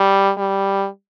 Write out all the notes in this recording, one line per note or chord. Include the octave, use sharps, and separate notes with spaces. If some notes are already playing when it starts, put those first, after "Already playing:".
Already playing: G3
G3